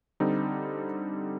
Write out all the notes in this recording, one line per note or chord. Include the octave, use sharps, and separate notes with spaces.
D3 G3 C4 D#4